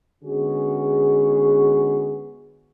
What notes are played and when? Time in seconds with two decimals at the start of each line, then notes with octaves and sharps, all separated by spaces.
0.24 D3 G#3 B3 C#4 F#4 G#4